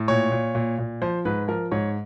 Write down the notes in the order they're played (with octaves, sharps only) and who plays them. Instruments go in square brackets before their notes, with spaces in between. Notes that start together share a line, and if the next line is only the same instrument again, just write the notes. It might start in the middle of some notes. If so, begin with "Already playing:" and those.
Already playing: [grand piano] A2
A#2 C#5
A#2
A#2
A#2
F3 C5
G#2 B4
F3 A#4
G#2 C#5